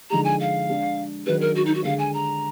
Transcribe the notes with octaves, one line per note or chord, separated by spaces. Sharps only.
D3 F3 G#3 D#4 G#4 A#5
G#5
F5
G#3 D4 G#4
D#3 F#3 D4 G#4 B4
A#4
F#4
D#4
F#4
D3 G#3 D4 G#4 F5
G#5
A#5